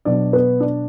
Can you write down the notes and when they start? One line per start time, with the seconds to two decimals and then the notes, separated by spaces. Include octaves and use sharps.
0.05 B2 F#3 D4 D5
0.33 B3 B4
0.60 D4 D5